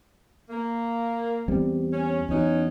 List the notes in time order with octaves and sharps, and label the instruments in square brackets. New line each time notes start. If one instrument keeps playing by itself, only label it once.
[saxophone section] A#3
[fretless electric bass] E2 G3 C4
[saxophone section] C#4
[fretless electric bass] E2 [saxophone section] F#3 C#4 D#4